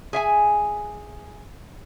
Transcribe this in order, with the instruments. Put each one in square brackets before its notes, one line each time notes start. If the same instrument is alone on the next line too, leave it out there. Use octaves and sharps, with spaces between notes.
[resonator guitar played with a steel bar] G#4 E5 G#5